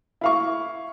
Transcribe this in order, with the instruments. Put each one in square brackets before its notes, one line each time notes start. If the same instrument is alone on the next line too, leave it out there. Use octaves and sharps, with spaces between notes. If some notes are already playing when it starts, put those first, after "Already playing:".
[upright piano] E4 F5 C#6